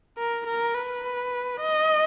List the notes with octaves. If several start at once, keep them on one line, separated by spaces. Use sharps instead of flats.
A#4
A#4
B4
D#5